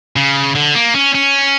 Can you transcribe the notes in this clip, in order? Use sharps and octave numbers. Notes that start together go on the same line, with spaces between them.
C#3
D3
A#3
C#4
C#4